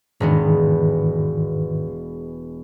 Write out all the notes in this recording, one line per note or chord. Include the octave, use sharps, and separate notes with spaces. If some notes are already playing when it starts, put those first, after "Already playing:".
E1 G#2 D#3 G#3 B3